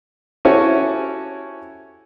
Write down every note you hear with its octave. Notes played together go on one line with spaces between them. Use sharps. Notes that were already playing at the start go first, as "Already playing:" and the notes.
C#4 E4 F#4 G4 A4 C#5